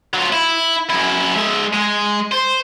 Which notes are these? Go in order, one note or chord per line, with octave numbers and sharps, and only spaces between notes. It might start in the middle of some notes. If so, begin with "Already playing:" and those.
F#3 F4
E4
F#2 E4
G#3 E5
G#3
C5